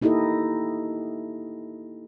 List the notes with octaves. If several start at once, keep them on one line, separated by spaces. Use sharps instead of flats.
A#3 D#4 E4 G4 A4 D#5